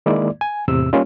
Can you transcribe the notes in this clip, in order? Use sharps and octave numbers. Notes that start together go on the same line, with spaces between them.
D#3 G#3 A#3 E4 D5
G#5
E2 A2 C3 E6
G3 A#3 C#4 D#4 F4